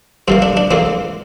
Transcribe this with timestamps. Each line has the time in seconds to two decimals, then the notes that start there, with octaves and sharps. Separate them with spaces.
0.28 G2 E3 A#3 C4
0.42 D4
0.57 D4
0.71 E2 E3 A#3 C4